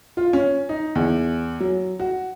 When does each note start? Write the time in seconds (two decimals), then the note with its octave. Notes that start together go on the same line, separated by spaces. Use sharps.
0.17 F4
0.33 C#4
0.69 D#4
0.95 E2
1.60 F#3
2.00 F#4